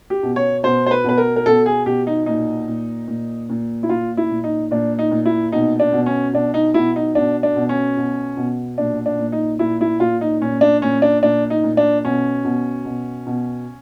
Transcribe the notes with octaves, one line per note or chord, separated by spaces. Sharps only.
G4
B2
C#5
B2 C5
C5
B4
B2 B4
A#4
A#4
B2 A4
G#4
B2 G4
D#4
A#2 D#4
A#2
A#2
A#2
E4
A#2 F4
E4
A#2
D#4
A#2 D4
D#4
A#2
E4
B2 D#4
D4
B2
C#4
B2 D4
D#4
B2 E4
D#4
B2 D4
D4
B2
C#4
B2
B2
A#2 D4
D4
A#2
D#4
A#2 E4
E4
A#2 F4
D#4
A#2 C#4
D4
A#2 C#4
D4
A#2 D4
D#4
A#2
D4
B2 C#4
B2
B2
B2